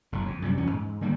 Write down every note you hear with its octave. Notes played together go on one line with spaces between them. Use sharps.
F#1 A2
F2
F#2 C3 G3
E2 E3 C#4
G#2
D3 D#3 G3 A#3